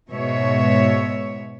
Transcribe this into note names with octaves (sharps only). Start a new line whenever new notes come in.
G#2 B2 C#5 E5